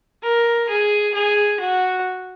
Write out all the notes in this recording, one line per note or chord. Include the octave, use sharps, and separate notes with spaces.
A#4
G#4
G#4
F#4